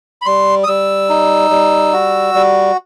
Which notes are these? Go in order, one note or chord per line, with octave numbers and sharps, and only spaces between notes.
B5
G3 C6
D#6
G3 E6
D#4
G3
F#4
G3